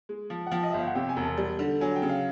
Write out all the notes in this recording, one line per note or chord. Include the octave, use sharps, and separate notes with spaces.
G#3
F3
F#5
F3 G5
D#5
E5
G1 F5
F#5
C3 G5
G#5
E1
A5
G3
D3
F#3 G#5
G5
C#3
F5